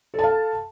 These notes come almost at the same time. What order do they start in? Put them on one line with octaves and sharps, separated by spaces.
A4 A5 F5